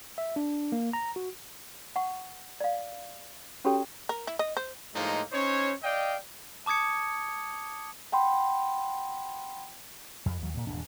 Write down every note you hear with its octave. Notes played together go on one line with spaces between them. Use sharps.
E5
D4
A#3
A#5
F#4
F#5 C#6
D5 F5
C#4 F#4 G4 A4 C#5 G5
A#4
E4
D#5
C5
A2 F3 G#3 A#3 D#4
C#4 D#4 C5 C#5
D5 D#5 F5 G5
A5 D6 D#6 G#6 C#7
F#5 G5 B5 C6
F2
D#2 F#3
G2 A#2
D#1 E2 G#2 D4